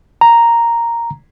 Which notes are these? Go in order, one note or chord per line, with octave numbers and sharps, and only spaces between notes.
A#5